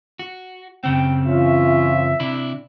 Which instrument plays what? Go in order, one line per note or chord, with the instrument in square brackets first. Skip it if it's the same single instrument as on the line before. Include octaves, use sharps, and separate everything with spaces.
[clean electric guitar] F#4
[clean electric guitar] F#2 C#3 C4 [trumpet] G5
[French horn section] E3 C#4 F4 [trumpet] E5
[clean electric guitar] C3 D4 E4